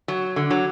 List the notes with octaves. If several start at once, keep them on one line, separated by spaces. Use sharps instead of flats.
F#3
D3
F#3